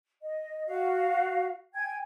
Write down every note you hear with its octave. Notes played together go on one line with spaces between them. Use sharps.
D#5
F#4 F5
G5 G#5 G#6